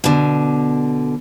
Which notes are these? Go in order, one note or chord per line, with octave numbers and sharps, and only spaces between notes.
B2 D3